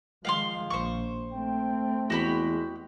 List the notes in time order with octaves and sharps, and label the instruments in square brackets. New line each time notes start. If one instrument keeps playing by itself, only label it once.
[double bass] D#3 G#3 [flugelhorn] F3 [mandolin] F5 F#5 C6
[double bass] A#1 [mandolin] C5 C#6
[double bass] A3 C4 [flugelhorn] G5
[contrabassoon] E2 [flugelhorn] G#3 [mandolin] F#4 G4 B5